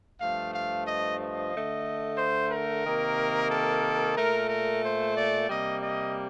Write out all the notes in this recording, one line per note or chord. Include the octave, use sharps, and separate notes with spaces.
G2 F3 A3 F5
F5
D#5
D#5
D3 A3
C5
A#4
C3 D#3 A#3
A4
A#2 A3 A#4
A#4
C5
D5
C3 G3 A#3 D#5
D#5